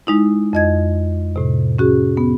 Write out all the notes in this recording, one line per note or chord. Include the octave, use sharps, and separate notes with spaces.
G#3 D#4 E4
F2 D#5 G#6
A2 C3
C#4 F#4 G#4
B3